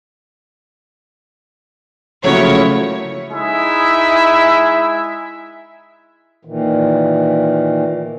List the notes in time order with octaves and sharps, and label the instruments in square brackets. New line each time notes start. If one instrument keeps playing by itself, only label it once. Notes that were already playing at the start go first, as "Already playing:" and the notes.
[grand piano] C#3 A3 [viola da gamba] F3 A#3 E4 [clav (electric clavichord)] F#3 F#4 [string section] C#5
[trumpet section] G#3 D#4 E4 E5 G#5
[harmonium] A#2 D#3 E3